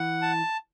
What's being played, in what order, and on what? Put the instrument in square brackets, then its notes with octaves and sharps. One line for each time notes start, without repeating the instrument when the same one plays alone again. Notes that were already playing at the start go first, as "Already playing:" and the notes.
Already playing: [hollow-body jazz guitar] E3 [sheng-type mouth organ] F#5
[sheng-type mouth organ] A5